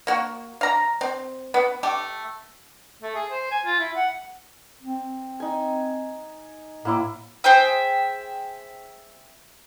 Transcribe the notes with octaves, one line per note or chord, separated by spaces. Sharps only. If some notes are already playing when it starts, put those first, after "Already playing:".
A#3 F#4
F5 A#5
C4
B3
A3 G4
A3
G#4
C5
G#5
F4
E4
F#5
C4
D#4 G#5
A2 A#3 E4 D6
G#4 C5 E5 G5